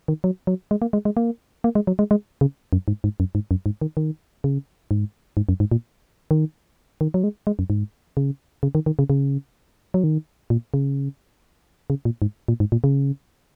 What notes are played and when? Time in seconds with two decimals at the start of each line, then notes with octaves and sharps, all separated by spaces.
0.08 D#3
0.24 F#3
0.47 F#3
0.71 G#3
0.82 A#3
0.93 G#3
1.05 G#3
1.17 A#3
1.64 A#3
1.75 G#3
1.87 F#3
1.99 G#3
2.11 G#3
2.41 C#3
2.73 F#2
2.88 G#2
3.04 G#2
3.20 F#2
3.35 G#2
3.51 F#2
3.66 G#2
3.82 D#3
3.97 D#3
4.44 C#3
4.91 G#2
5.37 G#2
5.49 F#2
5.60 G#2
5.72 A#2
6.31 D#3
7.01 D#3
7.14 F#3
7.24 G#3
7.47 G#3
7.59 F#2
7.70 G#2
8.17 C#3
8.63 C#3
8.75 D#3
8.86 D#3
8.99 C#3
9.10 C#3
9.94 F#3
10.04 D#3
10.50 A#2
10.74 C#3
11.90 C#3
12.05 A#2
12.22 G#2
12.48 A#2
12.60 G#2
12.72 A#2
12.84 C#3